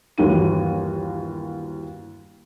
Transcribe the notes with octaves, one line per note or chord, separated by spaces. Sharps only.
G1 D#2 E3 F#4 D#7